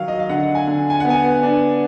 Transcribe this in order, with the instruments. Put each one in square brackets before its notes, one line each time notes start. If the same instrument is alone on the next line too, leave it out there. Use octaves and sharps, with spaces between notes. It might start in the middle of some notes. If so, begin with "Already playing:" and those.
Already playing: [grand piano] D#3 F#3 F5
D#5
F5
D3 F#5
G#5
D3
G#5
B3 F#5
G#5
D4